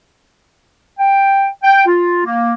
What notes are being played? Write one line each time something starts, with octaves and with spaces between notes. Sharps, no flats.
G5
G5
F4
A#3